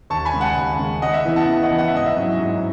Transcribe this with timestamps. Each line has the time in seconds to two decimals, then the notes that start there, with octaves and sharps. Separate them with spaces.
0.10 D#2 A5 C#6
0.25 G#5 B5
0.33 C#3 G#3
0.41 F#5 A5
0.56 D#2
0.79 C#3 G#3
1.02 C#3 D#5 F#5
1.14 E5
1.25 E3 B3 E4
1.36 F#5 A5
1.48 C#3
1.63 D#5 F#5
1.71 E3 B3 E4
1.78 F#5
1.88 E5
1.94 G#2 D#5
2.06 E5
2.16 F#3 C#4 E4
2.39 G#2